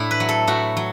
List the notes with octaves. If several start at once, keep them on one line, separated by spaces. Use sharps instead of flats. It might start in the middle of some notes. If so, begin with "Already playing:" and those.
Already playing: A2 D4 E4
B4
F#3
A4
A2 F#4
F#3